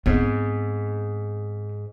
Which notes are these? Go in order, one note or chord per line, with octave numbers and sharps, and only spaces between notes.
G#2 B3 C4